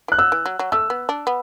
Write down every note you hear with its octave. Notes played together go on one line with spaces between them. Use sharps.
E3 F#6
F#3 E6
E3
F#3
F#3
A3 E6
B3
D4
B3